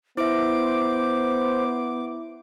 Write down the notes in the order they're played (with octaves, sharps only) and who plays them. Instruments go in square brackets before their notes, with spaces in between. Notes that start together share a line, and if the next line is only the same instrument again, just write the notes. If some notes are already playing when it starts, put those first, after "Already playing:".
[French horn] B3 [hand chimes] E4 E5 [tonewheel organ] C5 [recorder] D6